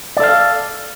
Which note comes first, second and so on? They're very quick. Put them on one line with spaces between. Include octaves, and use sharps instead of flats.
D5 A4 F5